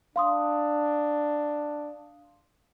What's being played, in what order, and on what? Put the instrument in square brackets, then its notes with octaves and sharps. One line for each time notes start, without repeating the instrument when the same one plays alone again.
[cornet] D4 [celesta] F5 C6 D#6